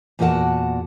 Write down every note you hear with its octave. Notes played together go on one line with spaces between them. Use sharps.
E2 A#2 F#4 A#4 F#5 A5